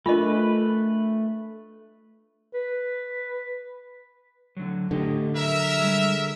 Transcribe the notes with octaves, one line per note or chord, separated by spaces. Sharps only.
A3 D4 F4 A#4 B4 D#5 G#5
B4
D3 F#3
A2 D3 G4 D#5
F#3 A#4 E5
G3 G#3